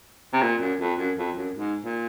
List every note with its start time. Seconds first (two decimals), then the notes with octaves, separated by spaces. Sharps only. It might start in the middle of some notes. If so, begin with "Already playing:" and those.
0.33 C3
0.42 A#2
0.60 F#2
0.80 F2
0.98 F#2
1.18 F2
1.37 F#2
1.55 G#2
1.85 A#2